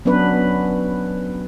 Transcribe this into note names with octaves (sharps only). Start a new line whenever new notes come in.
F#3 B3 C#4 D4 B4